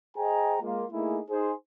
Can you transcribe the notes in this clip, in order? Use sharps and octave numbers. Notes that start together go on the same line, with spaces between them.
G#4 C5 D#5 G5 G#5 A#5
G#3 A#3 F4
A3 A#3 D#4 E4 G#4
D#4 G#4 C5